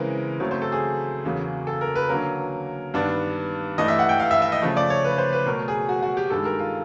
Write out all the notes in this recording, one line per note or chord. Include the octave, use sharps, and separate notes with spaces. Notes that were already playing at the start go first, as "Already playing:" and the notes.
Already playing: C#3 E3 G#3 C4 A#4
C#3 F#3 A3 C4
C5
A4
G#4
E2 C#3 F#3 A#3
A4
A#4
B4
D3 F#3 A#3 C#4 A#4
G2 D#3 G3 B3 D4
G2 E3 A3 D4 D#5
E5
F#5
G5
F5
E5
E5
D#5
C#3 F3 A3
D5
C#5
B4
C5
B4
B2 F#3 A3 A#4
G#4
F#4
F#4
G4
G2 D#3 G#3 A4
A#4
F4